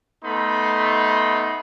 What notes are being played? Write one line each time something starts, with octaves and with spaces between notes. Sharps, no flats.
A3 B3 D#4 B5 C6